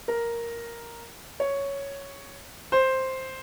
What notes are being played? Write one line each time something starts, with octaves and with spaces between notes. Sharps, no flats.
A#4
C#5
C5